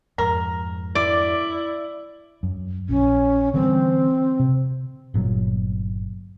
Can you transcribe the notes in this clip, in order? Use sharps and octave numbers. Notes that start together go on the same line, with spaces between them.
F2 G#2 A#4
E4 D5
F#2
A#1 C#4
D3 E3 G3 C4
C3
G1 A#2 F#3